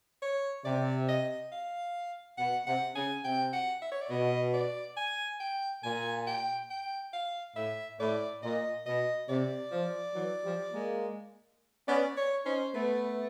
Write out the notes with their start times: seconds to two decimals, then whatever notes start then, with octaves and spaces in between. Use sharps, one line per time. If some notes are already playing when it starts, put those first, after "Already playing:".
0.22 C#5
0.65 C3 D5
1.09 D#5
1.52 F5
2.38 B2 F#5
2.67 C3 F#5
2.95 C#3 G#5
3.24 C3 G5
3.53 F#5
3.82 E5
3.92 C#5
4.01 D5
4.10 B2 D#5
4.54 D5
4.97 G#5
5.40 G5
5.83 A#2 G#5
6.27 G5
6.70 G5
7.13 F5
7.56 A2 E5
8.00 A2 D5
8.42 A#2 D#5
8.86 B2 D#5
9.29 C3 D5
9.72 F3
10.15 E3 F#3
10.44 F3 G3
10.72 G#3 A#3
11.88 B3 C#4 D5
12.17 C#5
12.45 C#4 D#4 C5
12.74 A3 B3 B4